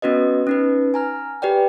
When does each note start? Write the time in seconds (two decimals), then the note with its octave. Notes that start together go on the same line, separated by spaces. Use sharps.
0.02 B3 C#4 F#4 B4 D#5
0.47 C#4 D#4 B4
0.94 G#5 A#5 F6
1.42 G4 B4 D5 G5